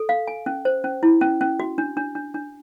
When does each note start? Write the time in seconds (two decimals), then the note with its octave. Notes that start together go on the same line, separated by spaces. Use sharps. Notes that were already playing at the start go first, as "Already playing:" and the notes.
Already playing: A4
0.09 F5
0.27 G#5
0.46 C#4
0.65 C5
0.84 C#4
1.03 E4
1.21 C#4
1.41 C#4
1.60 F#4
1.78 D4
1.97 D4
2.15 D4
2.34 D4